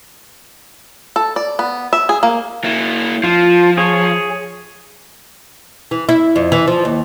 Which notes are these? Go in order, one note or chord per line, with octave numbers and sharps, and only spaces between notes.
A4
D5
B3
E5
G#4
A#3
A#3 E4
F3 F4
G#4 C#5
E3
E4
F2
E3
F3
D#2